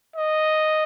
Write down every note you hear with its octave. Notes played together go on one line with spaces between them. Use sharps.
D#5